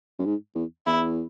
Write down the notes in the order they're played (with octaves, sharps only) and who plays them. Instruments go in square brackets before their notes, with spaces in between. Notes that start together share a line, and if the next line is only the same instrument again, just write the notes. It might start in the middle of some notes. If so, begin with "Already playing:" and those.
[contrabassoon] F#2
G#2
E2
[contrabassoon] E2 [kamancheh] E4